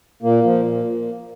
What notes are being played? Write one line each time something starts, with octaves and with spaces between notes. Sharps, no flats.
A#2 A#3
F3
A#2